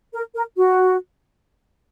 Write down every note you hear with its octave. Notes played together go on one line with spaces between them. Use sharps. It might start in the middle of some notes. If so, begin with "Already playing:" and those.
A#4
A#4
F#4